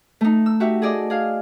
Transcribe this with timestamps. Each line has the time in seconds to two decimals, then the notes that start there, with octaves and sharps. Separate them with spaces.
0.21 A3 D#4
0.46 E6
0.60 F#4 G4 E5
0.82 G#4 A4 D5 D#5
1.10 G#4 F5